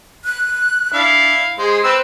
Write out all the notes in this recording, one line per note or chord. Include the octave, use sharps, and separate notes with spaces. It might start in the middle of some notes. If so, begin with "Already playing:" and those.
F#6
D4 E4 F5
G#3 G#4 C5
C4 B4 C5 E6